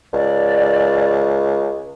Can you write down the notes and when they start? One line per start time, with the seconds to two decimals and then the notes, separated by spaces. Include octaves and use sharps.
0.13 C#2 D5